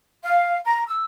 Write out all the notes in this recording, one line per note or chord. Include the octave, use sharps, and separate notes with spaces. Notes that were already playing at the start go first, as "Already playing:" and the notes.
F5
A#5
E6